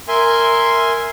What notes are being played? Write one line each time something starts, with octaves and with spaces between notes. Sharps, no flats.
A#4 E5 G#5 C6